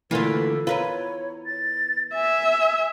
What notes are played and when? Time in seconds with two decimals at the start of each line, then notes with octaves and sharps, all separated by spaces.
0.11 D3 E3 A3 A#3 F4 B4
0.67 E2 F4 A#4 B4 C#5
1.46 A6
2.14 E5 G#5